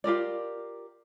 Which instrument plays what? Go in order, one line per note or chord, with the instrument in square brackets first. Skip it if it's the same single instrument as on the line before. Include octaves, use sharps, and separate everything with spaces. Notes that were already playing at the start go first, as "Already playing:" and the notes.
[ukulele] F4 G4 A#4 D5